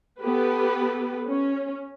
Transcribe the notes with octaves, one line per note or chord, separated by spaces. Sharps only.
B3 G4 A4 B4
C#4